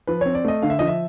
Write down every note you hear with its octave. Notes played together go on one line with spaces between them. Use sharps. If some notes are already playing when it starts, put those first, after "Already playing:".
F3 B4
C4 C#5
D5
A3 D#5
D3 F5
E5
F3 D#5
E5